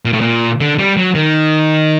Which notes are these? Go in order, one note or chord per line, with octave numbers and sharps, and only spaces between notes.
A#2
A2
A#2
D3
G3
F#3
D#3